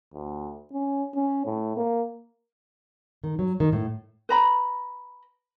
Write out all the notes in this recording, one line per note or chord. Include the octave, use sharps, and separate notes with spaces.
D2
C#4
C#4
A2
A#3
D#3
F#3
D#3
A2
B4 A#5 B5